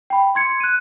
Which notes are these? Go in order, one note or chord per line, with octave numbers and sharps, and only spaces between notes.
G5 B5
C6 G#6 C#7
F#6 D#7